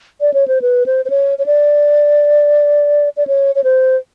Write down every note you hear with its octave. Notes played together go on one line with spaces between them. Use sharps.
D5
C#5
C5
B4
C5
C5
C#5
C#5
D5
D5
C#5
C#5
C5